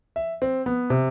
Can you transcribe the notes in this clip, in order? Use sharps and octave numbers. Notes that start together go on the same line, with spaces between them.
E5
C4
B3
C3